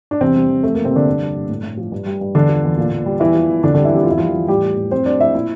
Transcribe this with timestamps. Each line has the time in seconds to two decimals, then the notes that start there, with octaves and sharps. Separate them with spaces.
0.11 D4
0.20 E2 C3 C4
0.35 G3
0.49 E2
0.63 F2 A3
0.74 F3 A#3
0.85 C3 C4
0.92 F2 D3 D4
1.07 G2
1.21 G3
1.35 G2
1.49 A2
1.63 A2
1.77 F3
1.92 G2
2.06 G3
2.21 G2
2.35 E2 D3 D4
2.49 F3
2.64 E2
2.78 A#2
2.92 A#2
3.06 G3
3.20 E2 E3 E4
3.35 F3
3.49 E2
3.63 F2 D3 D4
3.74 D3 G3 D4
3.85 E3 E4
3.92 F2 G4
4.03 F4
4.06 E2 E4
4.18 F3 G3 F4
4.35 E2
4.48 A2 G3 G4
4.63 G3
4.77 A2
4.91 F2 C4 C5
5.06 G3 D4 D5
5.20 F2 E4 E5
5.35 A#2 E4 E5